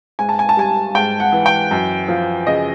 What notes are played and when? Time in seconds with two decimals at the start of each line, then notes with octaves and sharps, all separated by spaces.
0.19 G#2 G#5
0.29 A5
0.39 G#5
0.49 A5
0.57 G3 G#5
0.95 G#2 G5
1.20 F#5
1.33 E3
1.46 G5
1.71 F#2
2.08 F3
2.47 C#3 D#5